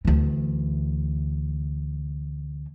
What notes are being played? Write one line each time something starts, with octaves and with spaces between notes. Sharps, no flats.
D2 E3